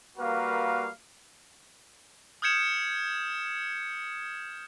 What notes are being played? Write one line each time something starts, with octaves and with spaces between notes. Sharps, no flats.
G3 A#3 F#4 A#4 B4 F5
D#6 F6 G6 G#6 C#7 E7